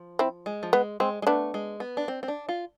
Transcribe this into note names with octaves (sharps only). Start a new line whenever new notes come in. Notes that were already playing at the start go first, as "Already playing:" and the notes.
Already playing: F3
C4 E4
G#3
F3
G#3 B3
G#3 C4
G#3
A3 B3 D4
G#3
B3
D4
C4
C4
D4
F4